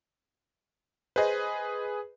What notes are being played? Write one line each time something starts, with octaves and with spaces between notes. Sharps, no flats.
G#4 B4 C5 D#5